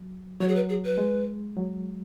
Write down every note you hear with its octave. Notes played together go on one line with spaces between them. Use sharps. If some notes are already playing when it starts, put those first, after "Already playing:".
Already playing: F#3
F#3 C#5
G#4
B4
G#4
B4
G#3
F#3